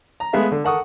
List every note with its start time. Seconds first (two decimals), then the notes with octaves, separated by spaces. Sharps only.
0.20 A#5
0.33 G#3 A3 B3 G#4 E5 F5
0.52 D3
0.64 A4 A#4 F#5 C#6 D#6